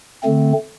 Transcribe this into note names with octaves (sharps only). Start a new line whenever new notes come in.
D3 A3 C4